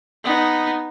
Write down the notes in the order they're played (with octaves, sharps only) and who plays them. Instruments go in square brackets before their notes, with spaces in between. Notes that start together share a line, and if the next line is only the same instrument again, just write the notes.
[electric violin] B3 D#4